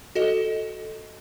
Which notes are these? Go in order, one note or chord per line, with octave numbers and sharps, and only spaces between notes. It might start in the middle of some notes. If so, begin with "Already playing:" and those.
F#4 A4 D#5